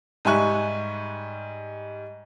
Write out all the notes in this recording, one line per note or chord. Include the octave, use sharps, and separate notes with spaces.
G#2 G3 E5 G#5 C#6 F#6